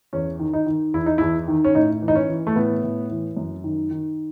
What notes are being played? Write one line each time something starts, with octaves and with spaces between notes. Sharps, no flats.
E2 C#4
D#3
D#4
D#3
E2 E4
D#4
E2 E4
D#3
C#4
A2 D#4
E3
D#4
C#4
E3
A3
A2 B3
A2
E3
F#2
D#3
D#3